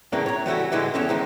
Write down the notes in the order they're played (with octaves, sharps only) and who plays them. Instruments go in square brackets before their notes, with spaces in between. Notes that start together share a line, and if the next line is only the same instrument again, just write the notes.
[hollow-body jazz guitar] A2 C#3 E3 A#3 D4
C#5 A#5
E3 G3 A3 E4 F#4
A2 D3 E3 G#3
E2 C#4 A4
D#3 E3 G#3